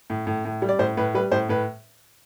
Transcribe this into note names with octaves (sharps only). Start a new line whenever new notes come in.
A2
A2
A2
G3
D5
A2 C5
A2 B4
G3 B4
A2 C5
A2 B4